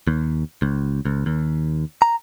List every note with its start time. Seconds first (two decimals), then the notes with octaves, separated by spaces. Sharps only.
0.08 D#2
0.62 C#2
1.05 C#2
1.26 D#2
2.02 A#5